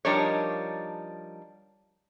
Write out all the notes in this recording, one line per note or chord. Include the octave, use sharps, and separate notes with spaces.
F3 G3 D4 D#4 A#4 C#5